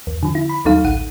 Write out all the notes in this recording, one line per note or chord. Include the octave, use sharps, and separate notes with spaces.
E2
D3 F3
E4
B5
D#2 F#3 G3 D#4 A4 F5
A1 D2 F#5 D#7